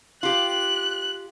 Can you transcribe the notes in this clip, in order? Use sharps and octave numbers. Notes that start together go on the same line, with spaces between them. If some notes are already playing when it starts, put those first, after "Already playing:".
F4 G4 F#6